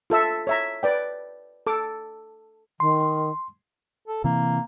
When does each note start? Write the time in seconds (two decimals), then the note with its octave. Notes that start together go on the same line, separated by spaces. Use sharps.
0.10 F4 A4 E5 E6
0.47 C#5 E5 A#5
0.83 B4 D5 G5
1.67 A4 D6
2.80 D#3 C6
4.08 A4
4.24 C3 E3 A#3